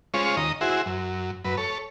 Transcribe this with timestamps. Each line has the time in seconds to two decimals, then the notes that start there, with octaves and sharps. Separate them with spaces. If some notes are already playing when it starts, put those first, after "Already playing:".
0.14 G#3 C#4 F4 C5 C#5
0.37 D#2 D#5 A#5
0.61 E4 F#4 G#4 C5
0.86 F#2
1.45 F#2 B4
1.57 A4 C#5